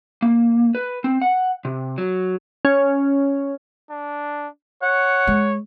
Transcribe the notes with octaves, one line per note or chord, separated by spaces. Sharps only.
A#3
B4
C4
F#5
C3
F#3
C#4
D4
C#5 F#5
G#3